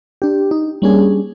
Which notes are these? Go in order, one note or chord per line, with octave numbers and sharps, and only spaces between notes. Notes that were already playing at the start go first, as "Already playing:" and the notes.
D4 G4
D#4
G3 A#3 C#4 D4 G#4